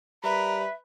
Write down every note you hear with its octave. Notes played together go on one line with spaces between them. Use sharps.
G3 A#4 B4 E5